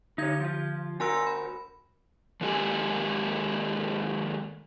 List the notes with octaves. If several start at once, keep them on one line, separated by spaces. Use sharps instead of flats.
D3 D#4 C#5 G#6
F3 F4
D2 F#4 A#4 G#5 C6 E6
B5
D#3 G#3 A#3 G4 A4 G#5